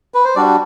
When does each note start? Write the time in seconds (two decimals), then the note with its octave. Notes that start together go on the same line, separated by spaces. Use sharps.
0.14 B4
0.25 C5
0.36 G3 D4 F#4 D5